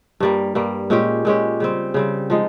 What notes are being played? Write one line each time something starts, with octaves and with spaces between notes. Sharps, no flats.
G2 G3 A#3
G2 G3 A#3
A#2 G#3 C#4 G4
A#2 G#3 C#4 G4
C#3 G3 C4
C#3 G3 C4
F3 G#3 D#4